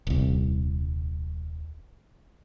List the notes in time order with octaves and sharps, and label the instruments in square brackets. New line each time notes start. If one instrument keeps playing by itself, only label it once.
[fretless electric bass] D#1 C2